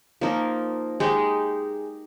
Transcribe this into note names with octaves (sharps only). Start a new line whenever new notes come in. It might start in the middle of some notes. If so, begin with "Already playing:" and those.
F3 A#3 D#4 A#4
G#3 D#4 G4